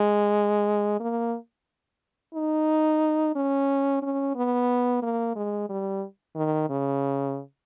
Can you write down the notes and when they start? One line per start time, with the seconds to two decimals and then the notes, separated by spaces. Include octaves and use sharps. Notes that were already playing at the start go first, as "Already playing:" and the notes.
Already playing: G#3
1.00 A#3
2.34 D#4
3.36 C#4
4.02 C#4
4.35 B3
5.02 A#3
5.36 G#3
5.69 G3
6.36 D#3
6.69 C#3